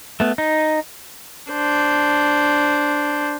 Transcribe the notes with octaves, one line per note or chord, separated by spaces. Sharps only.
A3 B3
D#4
D4 C5